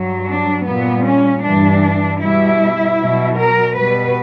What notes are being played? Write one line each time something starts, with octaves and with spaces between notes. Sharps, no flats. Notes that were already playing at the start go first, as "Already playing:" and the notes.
Already playing: G2 F#3
D4
A#2 G3 B3
C#4
G2 E3 G3 D4
B2 G3 E4
B2 F#3
A#4
B2 G3 B4